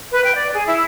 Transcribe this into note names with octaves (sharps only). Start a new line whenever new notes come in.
B4
G5
D5
G#4
E4